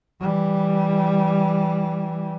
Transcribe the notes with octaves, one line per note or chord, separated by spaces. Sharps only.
E3 G3